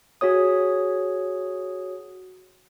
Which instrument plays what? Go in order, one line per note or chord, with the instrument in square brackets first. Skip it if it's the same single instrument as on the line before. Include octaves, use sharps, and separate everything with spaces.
[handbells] F#4 G#4 C#5 D#6